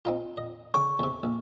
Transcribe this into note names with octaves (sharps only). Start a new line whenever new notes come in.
C4 D#4 F4
D#5
C#3 G5 C#6 D6
E2 C3
A#1